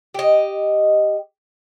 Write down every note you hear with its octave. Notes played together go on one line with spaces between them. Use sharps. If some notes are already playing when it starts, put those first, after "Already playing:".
G4 D#5